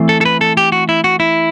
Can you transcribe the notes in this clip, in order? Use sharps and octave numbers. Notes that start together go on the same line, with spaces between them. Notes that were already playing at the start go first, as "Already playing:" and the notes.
Already playing: E3 A3 C4
A4
A4
B4
A4
G4
F#4
E4
F#4
E4